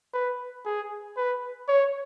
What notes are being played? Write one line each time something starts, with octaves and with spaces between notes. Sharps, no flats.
B4
G#4
B4
C#5